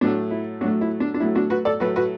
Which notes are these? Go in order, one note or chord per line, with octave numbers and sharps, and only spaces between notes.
A2 F#3 A3 D4
E4
A2 F#3 A3 D4 F#4
E4
D4
D4
A2 F#3 A3 E4
D4 F#4
F#4 B4
A4 D5
A2 F#3 A3 F#4 B4
F#4 B4